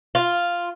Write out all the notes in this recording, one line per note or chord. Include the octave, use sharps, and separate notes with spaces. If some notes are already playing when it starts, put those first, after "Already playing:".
F4